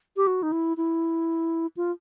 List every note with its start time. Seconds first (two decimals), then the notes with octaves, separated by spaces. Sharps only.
0.17 G4
0.27 F#4
0.43 D#4
0.52 E4
0.77 E4
1.77 F4